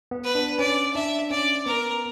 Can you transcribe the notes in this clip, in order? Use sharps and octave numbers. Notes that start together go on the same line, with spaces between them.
B3
B4
D4
C#4 D5
D4 E5
C#4 D5
B3 A#4